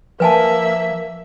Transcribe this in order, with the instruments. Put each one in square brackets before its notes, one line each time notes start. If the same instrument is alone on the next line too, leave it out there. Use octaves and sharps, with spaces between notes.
[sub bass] F3 [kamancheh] A#3 E5 [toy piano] B4 G#5 A5